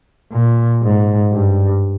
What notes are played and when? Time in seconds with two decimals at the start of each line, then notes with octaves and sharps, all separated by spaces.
0.32 A#2
0.83 G#2
1.33 G2